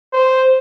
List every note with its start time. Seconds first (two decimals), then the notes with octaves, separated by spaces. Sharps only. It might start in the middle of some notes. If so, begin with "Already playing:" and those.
0.13 C5